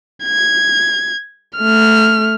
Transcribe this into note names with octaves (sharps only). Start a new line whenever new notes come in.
G#6
A3 F6